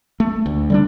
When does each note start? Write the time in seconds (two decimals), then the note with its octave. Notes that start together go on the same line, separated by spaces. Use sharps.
0.20 A3
0.46 D2
0.70 D3 G3 C4 D4